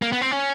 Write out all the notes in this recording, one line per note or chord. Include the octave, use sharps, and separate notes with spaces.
A#3
B3
C4
C#4